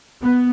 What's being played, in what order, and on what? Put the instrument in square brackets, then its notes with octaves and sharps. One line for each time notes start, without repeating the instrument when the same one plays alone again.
[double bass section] B3